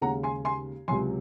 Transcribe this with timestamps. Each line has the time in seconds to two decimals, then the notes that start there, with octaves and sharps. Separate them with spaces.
0.01 D#2 C#3 G#3 C#4 F#5 A#5
0.23 G#5 C6
0.45 G#5 C6
0.88 C#2 C3 F#3 G#5 C6